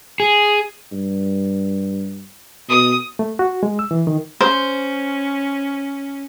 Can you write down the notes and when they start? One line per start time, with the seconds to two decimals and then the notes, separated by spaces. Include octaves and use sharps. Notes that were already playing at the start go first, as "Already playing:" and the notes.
0.20 G#4
0.92 G2
2.69 B2 D#6
3.19 A3
3.39 F#4
3.63 G#3
3.79 E6
3.91 E3
4.07 D#3
4.41 C#4 C5